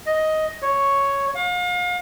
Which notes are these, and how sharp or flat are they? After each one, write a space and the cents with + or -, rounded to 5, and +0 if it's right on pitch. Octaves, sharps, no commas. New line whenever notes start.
D#5 +10
C#5 +0
F5 +40